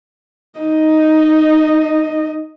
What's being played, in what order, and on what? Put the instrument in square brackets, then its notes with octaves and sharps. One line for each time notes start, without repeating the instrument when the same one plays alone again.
[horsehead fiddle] D#4 D#5